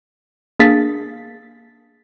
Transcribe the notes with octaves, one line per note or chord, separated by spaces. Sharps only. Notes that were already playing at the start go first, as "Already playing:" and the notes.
A#3 D4 G#4 F5 A6 B6